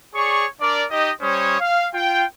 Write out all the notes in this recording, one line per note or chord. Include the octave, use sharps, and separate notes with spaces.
G#4 C#5 D5 C#6
D4 A#4 D5
D#4 G4 D#5
G3 C#4 C5 C#5 D#6
F5
F4 G5